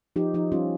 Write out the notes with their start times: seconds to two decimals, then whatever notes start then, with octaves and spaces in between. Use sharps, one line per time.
0.16 F3 D#4 G4
0.34 F3 D#4
0.52 G3 C#4 F4